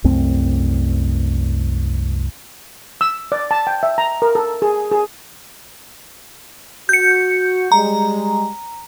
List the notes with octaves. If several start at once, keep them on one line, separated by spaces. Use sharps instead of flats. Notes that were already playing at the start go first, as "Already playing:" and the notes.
C2 F#2 A3 C4
E6
D5
A5
G5
E5
A#5
A#4
A4
G#4
G#4
F#4 G6 C#7
G3 G#3 A#5